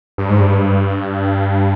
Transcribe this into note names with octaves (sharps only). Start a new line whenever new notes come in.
G2
G#2
G2